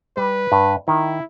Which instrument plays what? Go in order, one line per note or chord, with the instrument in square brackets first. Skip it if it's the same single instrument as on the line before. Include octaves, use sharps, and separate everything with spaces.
[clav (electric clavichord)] G3 [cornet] B4
[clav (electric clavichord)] G2
[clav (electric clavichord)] D#3 [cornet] E4